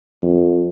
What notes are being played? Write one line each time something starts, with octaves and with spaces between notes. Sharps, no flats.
F2